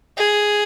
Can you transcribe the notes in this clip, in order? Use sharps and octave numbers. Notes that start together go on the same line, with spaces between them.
G#4